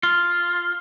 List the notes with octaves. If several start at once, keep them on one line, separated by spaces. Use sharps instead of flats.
F4